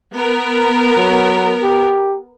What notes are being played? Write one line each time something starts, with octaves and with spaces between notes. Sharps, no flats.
B3 A#4
F#3
G4